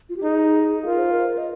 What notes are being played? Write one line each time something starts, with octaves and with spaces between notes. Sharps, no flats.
F4
G4
D#4 G#4
F4 A#4
C5
A#4
D#5